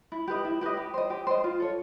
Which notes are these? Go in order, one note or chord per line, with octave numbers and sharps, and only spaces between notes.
E4
G4 B4 D#5
E4
G4 B4 D#5
G4
C5 D#5
G4
C5 D#5
F4
A4 C#5